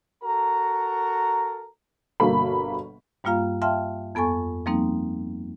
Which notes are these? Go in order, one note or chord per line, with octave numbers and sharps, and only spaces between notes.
F#4 A4 A#4 A#5
G1 B2 A#3 A4 B5
G2 G3 A#3 F4 F5 A#5
E5 F5 G5 A5 C6 F6
F2 B3 A4 G#5 C#6
F3 G3 A#3 C4 D#4